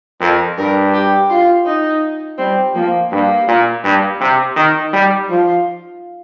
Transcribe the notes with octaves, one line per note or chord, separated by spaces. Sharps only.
F2 A#4
G2 A#4
G4
F4
D#4
G3 C4
F3 A#3
G2 A#3
A#2
G2
C3
D#3 D#4
G3
F3 F4